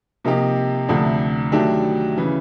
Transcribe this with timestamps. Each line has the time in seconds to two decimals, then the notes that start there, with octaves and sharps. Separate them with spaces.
0.25 C3 F3 A#3 D#4 G4
0.88 D2 C3 F3 A3 D4
1.52 D#3 F#3 A3 D4 G4
2.17 C#3 E3